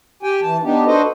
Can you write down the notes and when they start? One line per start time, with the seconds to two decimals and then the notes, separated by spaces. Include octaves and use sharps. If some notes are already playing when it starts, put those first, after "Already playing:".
0.23 G4 G5 G#5
0.42 E3 A5
0.63 B3 D4 D#4 G4
0.86 D4 F#4 A4 B4 C5 D#5